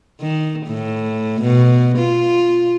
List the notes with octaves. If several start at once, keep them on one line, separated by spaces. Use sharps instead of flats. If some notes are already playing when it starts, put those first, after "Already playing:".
D#3
A2
B2
F4